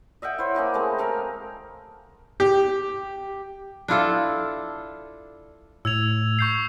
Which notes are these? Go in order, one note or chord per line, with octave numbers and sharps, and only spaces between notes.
D#5 E5 F#5 G5
E4 C5 C#5
A#3 C#4 D#5 B5
G#3 A3 C4 D#5
A4 A#4 F5 G5
G4
D4 E4 F4 A4
A2 E6 G#6 F7
C#6 G6 C7